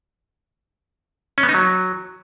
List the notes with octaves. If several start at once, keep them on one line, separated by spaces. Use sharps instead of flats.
C#4
B3
D#4
F#3